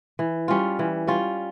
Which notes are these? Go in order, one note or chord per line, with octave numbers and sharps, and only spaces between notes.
E3
G3 C#4 F4
E3
G3 C#4 F4